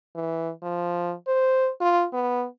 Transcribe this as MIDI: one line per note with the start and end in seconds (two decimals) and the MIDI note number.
0.15 0.51 52
0.63 1.14 53
1.28 1.70 72
1.81 2.06 65
2.13 2.46 59